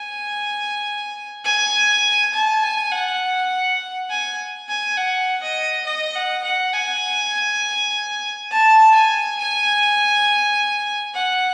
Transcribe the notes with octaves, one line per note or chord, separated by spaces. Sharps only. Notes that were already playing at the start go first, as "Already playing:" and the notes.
Already playing: G#5
G#5
A5
G#5
F#5
G#5
G#5
F#5
D#5
D#5
F#5
F#5
G#5
A5
G#5
G#5
F#5